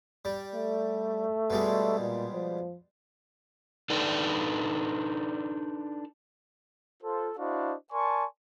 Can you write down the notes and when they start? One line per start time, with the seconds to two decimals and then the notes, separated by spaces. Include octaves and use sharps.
0.25 G3
0.55 A3
1.50 B2 G3 G#3
1.99 A#2
2.33 F3
3.90 D4 D#4 A4 B4 D5 G5
7.02 F4 A4 C5
7.37 D4 E4 F#4 C5 D#5 F5
7.92 A#4 D5 G#5 A5 C6 C#6